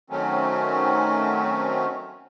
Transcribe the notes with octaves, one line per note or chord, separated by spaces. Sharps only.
D#3 F#3 A3 C4 C#4